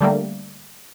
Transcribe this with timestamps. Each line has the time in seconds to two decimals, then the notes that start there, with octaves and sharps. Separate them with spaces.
0.01 D3 G3 A3 A#3